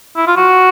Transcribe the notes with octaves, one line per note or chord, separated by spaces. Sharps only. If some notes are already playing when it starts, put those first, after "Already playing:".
E4
F4
F#4